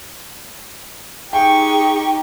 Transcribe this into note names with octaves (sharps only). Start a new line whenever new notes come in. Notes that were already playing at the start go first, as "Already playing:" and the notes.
D#4 G4 G#4 G5 C#6